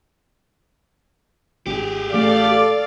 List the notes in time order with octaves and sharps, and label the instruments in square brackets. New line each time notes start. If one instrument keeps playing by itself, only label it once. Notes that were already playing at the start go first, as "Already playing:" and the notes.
[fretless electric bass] G#1 [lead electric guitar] G4 G#4
[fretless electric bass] A1 A3 [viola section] A4 D5 F5 [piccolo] D6